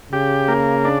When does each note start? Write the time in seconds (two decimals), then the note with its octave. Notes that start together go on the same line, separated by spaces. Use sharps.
0.13 C#3 G4
0.48 A#3
0.85 D4